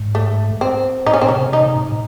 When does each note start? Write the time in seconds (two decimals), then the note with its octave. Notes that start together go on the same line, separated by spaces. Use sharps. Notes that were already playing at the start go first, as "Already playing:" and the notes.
Already playing: G#2
0.15 A3
0.61 C4
1.06 A2 D#4
1.14 C#4
1.21 C4
1.29 C3 C#4
1.52 C3 D#4
1.66 C3
1.76 A2